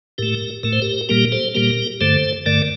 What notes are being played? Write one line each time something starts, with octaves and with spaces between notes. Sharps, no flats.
A2 A3 G4 A#4
A2 A3 A#4
C5
G4 A#4
A#2 G3 A#3 G4 A#4
A4 C5
A#2 G3 A#3 G4 A#4
G2 D3 A3 A4 C5
G2 D3 A3 A#4 D5